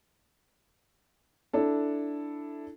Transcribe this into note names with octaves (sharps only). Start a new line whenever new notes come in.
D4 E4 A4